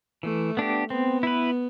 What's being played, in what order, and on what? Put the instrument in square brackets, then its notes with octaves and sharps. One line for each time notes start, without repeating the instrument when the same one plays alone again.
[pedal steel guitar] E3 [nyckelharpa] A3
[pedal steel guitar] B3 D4 G4
[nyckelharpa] B3 [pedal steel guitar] C4
[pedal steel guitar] E4 B4